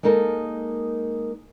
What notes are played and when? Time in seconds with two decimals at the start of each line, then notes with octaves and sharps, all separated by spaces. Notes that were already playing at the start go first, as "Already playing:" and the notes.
0.03 G#3 A#3 D#4 A4 A#4